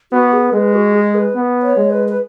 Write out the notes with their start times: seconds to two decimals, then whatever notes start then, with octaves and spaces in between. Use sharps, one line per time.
0.12 B3 F#4
0.33 G#4
0.53 G#3 B4
0.74 F#4
0.94 G#4
1.15 B4
1.35 B3
1.63 C#5
1.77 G#3
1.90 B4
2.08 B4